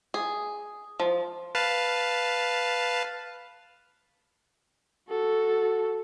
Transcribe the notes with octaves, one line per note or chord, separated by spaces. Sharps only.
G#4
F3
B4 F5 A5
F#4 A4